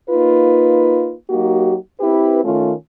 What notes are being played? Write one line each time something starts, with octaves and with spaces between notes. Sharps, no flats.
A#3 D#4 F4 B4
F#3 A#3 D#4 F#4 G4
C4 E4 G4 B4
D#3 A3 C#4 F4